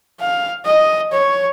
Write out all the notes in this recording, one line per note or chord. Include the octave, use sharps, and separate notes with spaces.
F5
D#5
C#5